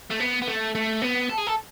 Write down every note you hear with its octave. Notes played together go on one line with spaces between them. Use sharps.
A3
B3
B3
A3
A3
B3
A4
G#4
A4